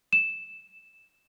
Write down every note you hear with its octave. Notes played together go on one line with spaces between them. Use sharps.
E7